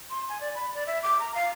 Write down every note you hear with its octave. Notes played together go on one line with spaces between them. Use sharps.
C6
G#5
D5
B5
D5
E5
D6
A#5
F5